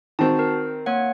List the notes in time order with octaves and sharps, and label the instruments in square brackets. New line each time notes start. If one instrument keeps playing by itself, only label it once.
[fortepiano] D#3 C4 [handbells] F#4 A5
[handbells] A#4
A#3 C#5 F#5